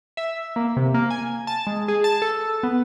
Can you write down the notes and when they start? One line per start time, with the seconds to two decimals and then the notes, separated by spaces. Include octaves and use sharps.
0.17 E5
0.56 A#3
0.77 C3
0.94 A#3
1.10 G#5
1.47 A5
1.67 G#3
1.88 G#4
2.04 A5
2.22 A4
2.63 B3